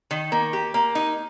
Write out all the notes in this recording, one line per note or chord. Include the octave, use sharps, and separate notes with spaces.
D#3
A#3
G4
A#3
D#4